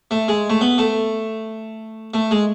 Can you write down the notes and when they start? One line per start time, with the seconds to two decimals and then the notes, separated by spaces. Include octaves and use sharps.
0.11 A3
0.28 G#3
0.50 A3
0.61 B3
0.78 A3
2.14 A3
2.31 G#3